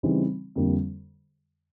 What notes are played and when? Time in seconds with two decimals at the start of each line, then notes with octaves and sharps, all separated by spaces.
0.03 C#3 E3 G3 C4 D#4
0.56 F2 D3 G3 A#3